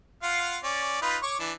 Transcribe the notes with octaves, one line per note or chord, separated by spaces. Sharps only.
F4 F5 F#5
C#4 D5
D#4 F4 B4
C#5 C#6 D6
E3 D4